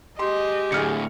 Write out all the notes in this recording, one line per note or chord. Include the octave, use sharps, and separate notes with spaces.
G#3 G4 D#5 C6
D2 A2 G#4 F6 C#7